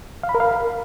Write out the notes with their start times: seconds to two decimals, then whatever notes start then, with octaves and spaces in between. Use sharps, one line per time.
0.23 F5
0.29 B5
0.35 A#4
0.40 F5